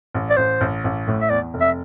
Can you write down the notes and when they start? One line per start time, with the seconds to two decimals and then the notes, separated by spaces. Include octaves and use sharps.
0.14 A1
0.30 D5
0.37 A1 C5
0.61 A1
0.84 A1
1.08 A2
1.21 E5
1.30 E2 D5
1.54 F1
1.61 E5